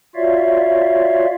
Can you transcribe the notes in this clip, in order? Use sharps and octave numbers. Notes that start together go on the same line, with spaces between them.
F4 F#4 C#5 D5 E5 F5